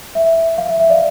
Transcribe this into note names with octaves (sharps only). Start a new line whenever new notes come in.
E5
F5
E5
E5
D5